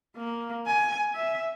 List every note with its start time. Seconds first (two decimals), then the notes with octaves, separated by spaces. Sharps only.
0.17 A#3
0.66 G#5
1.15 E5